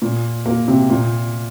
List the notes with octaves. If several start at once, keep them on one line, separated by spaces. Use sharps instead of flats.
A#2
A#3
C3
A#2